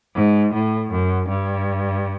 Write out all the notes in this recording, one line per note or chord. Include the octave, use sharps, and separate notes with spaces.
G#2
A2
F#2
G2